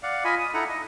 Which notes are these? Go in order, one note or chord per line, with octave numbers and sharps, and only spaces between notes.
D5 F5 F#5
F4 D#5 G#5 B5
D#6
D#4 E4 A4 F#5 A#5
D#5